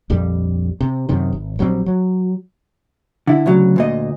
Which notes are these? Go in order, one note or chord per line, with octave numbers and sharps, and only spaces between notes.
A#1 F2 G3
C3
F#2 C3 D#3
G#1
A#1 F#3 G3 C4
F#3
D3 E4
D2 C#3 F#3
D2 A#2 D#5